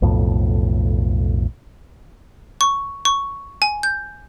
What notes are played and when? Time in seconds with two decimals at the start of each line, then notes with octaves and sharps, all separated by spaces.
0.02 B1 F2 A2
2.61 C#6
3.05 C#6
3.62 G#5
3.83 G6